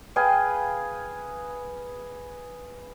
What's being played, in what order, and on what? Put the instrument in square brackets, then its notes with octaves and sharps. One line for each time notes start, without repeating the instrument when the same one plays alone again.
[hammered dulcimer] G#4 B4 F5 G5